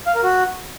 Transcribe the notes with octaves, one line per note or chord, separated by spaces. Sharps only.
F5
A#4
F#4